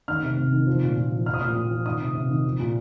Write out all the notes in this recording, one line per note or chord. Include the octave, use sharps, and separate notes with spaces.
D#3 F6
C3
C3
D#3
F3
A#2
A#2
F3
F3 F6
D#6
A#2 F6
A#2
F3
D#3 D#6
C3
C3
D#3
F3
A#2